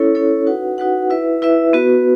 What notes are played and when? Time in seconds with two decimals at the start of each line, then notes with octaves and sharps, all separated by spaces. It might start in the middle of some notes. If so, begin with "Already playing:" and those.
Already playing: C#4 E4 A4 C#5
0.15 C#4 E4 A4 C#5
0.46 D#4 F#4 B4 F#5
0.78 D#4 F#4 B4 F#5
1.10 E4 B4 E5
1.42 E4 B4 E5
1.73 B3 F#4 B4